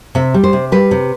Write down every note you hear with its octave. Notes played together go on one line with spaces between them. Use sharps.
C3 E5
G3
C5
C3
G3 B4
C3